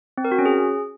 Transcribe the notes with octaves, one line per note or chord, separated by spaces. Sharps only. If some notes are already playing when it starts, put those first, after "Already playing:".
C4
A#4
F#4
C#4
G#4